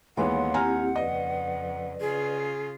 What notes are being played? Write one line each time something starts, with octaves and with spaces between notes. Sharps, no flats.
D#2 E3 G#3 B3 C#5 F5 F#5 C6
C4 E4 G4 G#5 A#5 F6
F2 C#3 B4 D5 D#5
C#3 F4 G#4